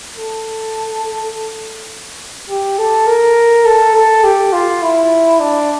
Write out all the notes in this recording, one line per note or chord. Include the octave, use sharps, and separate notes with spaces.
A4
G4
A4
A#4
A4
A4
G4
F4
E4
D4